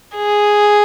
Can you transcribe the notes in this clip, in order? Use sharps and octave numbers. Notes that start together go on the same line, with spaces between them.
G#4